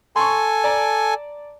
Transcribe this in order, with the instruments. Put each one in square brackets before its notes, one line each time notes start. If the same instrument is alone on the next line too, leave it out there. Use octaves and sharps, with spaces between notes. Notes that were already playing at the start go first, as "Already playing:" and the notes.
[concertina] A4 G#5 [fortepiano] C6 C#6
[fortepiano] D5 A5 A#5